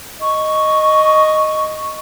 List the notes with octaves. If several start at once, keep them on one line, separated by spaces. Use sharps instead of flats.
D#5 C#6